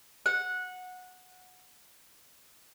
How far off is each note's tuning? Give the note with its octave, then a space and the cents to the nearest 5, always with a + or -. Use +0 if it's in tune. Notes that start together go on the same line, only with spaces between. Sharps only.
F#5 -15